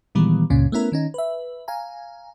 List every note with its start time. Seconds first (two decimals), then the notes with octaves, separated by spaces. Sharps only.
0.15 A#2 D#3 E3 G3 G#3 B3
0.50 C#2 G2 A#2 C#3 C#4
0.72 A3 B3 C#4 E4 A#4
0.92 D#3 C#4 D#4
1.14 B4 E5
1.68 F5 G#5 A#5